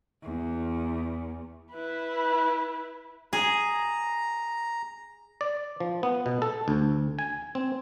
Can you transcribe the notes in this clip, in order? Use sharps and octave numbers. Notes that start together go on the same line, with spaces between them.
E2
E4 B4
G#4 A#5
D5
F3
B3
B2
A4
D2
G#5
C4